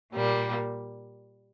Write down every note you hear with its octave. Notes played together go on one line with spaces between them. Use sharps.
A#2 G3 A#3